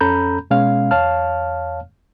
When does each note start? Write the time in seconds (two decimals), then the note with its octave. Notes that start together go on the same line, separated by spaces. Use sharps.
0.01 F2 C#4 A4 A#5 B5 G6
0.50 B2 G#3 C#4 F5
0.91 E2 C#5 F5 A5 F6